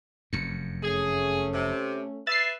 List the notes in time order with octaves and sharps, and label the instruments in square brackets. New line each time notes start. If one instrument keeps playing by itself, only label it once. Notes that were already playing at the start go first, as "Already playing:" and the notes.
[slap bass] F1 F#2 [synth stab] C#7
[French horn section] A3 C#4 [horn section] G#4
[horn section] C3
[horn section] B4 E5 [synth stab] A6 C7